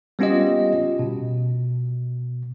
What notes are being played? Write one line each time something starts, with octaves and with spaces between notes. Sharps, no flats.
G3 B3 C#4 F4 G4 D#5
B2